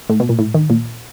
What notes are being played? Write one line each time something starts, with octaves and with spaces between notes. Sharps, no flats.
A2
B2
A#2
A2
D#3
A#2